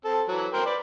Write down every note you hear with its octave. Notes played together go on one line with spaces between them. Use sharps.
C4 A4
E3 F#3
A#4 C5 G5
B4 D5